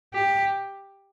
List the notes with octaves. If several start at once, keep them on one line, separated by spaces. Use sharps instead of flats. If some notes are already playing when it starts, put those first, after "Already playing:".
G4